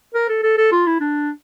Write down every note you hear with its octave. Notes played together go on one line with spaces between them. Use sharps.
A#4
A4
A4
A4
F4
E4
D4